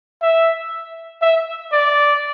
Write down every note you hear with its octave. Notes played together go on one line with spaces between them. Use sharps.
E5
E5
D5